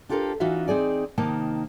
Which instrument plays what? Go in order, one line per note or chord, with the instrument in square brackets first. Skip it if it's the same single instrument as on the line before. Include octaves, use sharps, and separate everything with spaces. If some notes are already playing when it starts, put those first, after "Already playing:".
[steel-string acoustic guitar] D4 F4 G4 A4 A#4 C5
E3 C#4 D#4 F4 F#4 E5
C4 D#4 G#4 D5
C3 D#3 A#3 D#4 A5